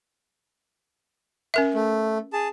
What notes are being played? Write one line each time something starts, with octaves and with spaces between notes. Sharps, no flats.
C#4 A#4 E5
A3
G#4 A5